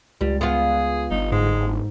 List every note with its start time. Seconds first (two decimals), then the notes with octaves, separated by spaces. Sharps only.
0.21 C#2 G3
0.41 B3 F4 G#4
1.11 G1 D#4
1.32 G#2 G#3